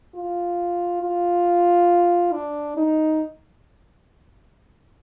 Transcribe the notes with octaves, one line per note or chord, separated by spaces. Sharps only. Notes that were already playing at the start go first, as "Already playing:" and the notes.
F4
F4
D4
D#4